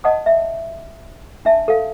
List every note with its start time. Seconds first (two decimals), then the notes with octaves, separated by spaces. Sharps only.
0.04 D#5 F#5 A5 D#6
0.26 E5
1.45 D4 E5 A5
1.68 A4 F5